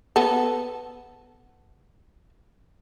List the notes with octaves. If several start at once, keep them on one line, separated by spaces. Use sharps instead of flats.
B3 A4